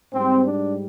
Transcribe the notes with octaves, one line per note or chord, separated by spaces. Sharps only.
G#2 G3 C4
D4